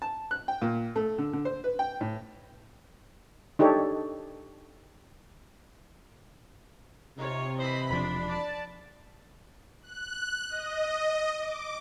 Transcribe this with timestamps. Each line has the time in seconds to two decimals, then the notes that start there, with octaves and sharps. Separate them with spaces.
0.02 A5
0.31 F#6
0.48 G5
0.62 A#2
0.96 A3
1.18 D3
1.33 D3
1.45 C5
1.64 B4
1.79 G5
2.01 A2
3.59 D4 D#4 G4 A4 C#5
7.18 C3 D#4 F4 C#5
7.59 E3 C5 D#5 B5
7.91 E1 F3 D4 B5
8.28 D5 A5
9.82 F#6
10.49 D#5
11.40 D6